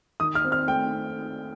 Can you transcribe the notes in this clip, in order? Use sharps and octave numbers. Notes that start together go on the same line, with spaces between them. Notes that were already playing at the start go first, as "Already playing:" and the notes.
D#3 D#6
F6
C4
F6
A3 G5
C4